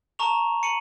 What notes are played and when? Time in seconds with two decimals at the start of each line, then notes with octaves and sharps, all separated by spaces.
0.19 A5 A#5 C#6 F7
0.63 C#7 D#7 F#7